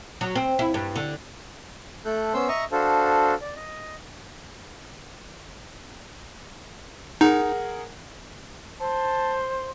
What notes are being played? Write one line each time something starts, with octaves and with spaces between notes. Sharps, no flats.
F#3
C4
E4
G2
D3
A3 A4 F#6 G6
B3 C#4 C5 C6 E6 G6
D#5 E5 A#5 C#6 D#6
D4 F#4 A4 C5 F5 A5
D5
D#5
D#4 G#4 A#4 F#5
C5 A5